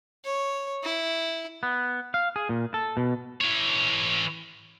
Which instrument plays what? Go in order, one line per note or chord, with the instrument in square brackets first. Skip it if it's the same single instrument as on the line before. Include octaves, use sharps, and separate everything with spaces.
[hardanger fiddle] C#5
E4
[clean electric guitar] B3
F5
G#4
A#2
A4
B2
[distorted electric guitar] E3 C#5